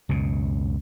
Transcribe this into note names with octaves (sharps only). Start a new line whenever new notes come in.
C#2 F#2 B2